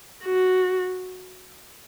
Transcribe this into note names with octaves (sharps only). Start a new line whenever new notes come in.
F#4